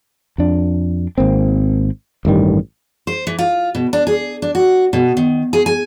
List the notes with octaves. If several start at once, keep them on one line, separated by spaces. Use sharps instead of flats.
F2 D4
G#1 A#3 C4
A1 G2 D#3 G3
C5
E3
F4
B2
D4
G#4
D4
F#4
B2
D#3
G#4
G#5